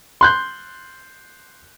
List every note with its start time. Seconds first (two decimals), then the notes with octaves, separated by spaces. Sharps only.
0.21 C6 F#6 G6